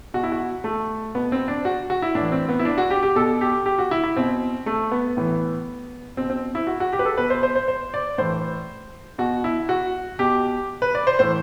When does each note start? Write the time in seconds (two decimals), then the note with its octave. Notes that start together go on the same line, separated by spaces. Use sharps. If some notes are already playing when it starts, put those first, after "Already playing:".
0.14 B2 F#4
0.23 E4
0.32 F#4
0.64 A3
1.15 B2 B3
1.32 C4
1.48 D4
1.65 F#4
1.90 F#4
2.02 E4
2.15 A2 E3 D4
2.32 C4
2.49 B3
2.59 E4
2.65 D4
2.78 F#4
2.90 G4
3.03 G4
3.16 B2 A4
3.41 G4
3.66 G4
3.79 F#4
3.91 E4
4.04 E4
4.16 B2 C4
4.66 A3
4.91 B3
5.17 A2 E3
6.17 B2 C4
6.30 C4
6.55 E4
6.67 F#4
6.80 F#4
6.93 G4
6.99 B4
7.05 A4
7.18 B2 B4
7.30 C5
7.43 C5
7.55 C5
7.68 C5
7.94 D5
8.18 A2 E3 C5
9.18 B2 F#4
9.44 E4
9.69 F#4
10.19 B2 G4
10.82 B4
10.95 D5
11.07 C5
11.19 A2 E3 C5